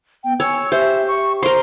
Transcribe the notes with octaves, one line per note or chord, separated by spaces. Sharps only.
B3 G5
C#5 G#5 E6
G4 C5 E5
C#6
A#4 C5 C6